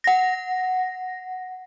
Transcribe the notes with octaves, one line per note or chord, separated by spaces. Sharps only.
F#5 A#6